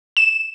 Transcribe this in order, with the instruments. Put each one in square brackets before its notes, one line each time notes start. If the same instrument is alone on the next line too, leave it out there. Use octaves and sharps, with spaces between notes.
[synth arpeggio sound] E7